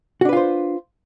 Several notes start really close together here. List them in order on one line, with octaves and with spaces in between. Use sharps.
F#4 D4 B4 F4 C5